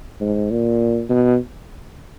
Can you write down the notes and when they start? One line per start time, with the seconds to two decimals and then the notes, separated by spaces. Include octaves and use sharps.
0.21 G#2
0.51 A#2
1.09 B2